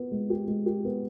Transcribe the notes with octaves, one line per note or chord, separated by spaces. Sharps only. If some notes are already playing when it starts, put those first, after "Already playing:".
Already playing: B3
G#3
G4
G#3
G4
B3